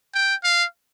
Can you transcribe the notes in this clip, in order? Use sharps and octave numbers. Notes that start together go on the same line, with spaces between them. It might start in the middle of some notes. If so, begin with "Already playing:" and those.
G5
F5